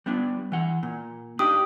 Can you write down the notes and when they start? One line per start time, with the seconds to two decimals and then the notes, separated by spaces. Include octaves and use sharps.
0.06 G3 B3 D4
0.52 E3 F#5
0.83 A#2
1.39 D4 D#4 G4 D#6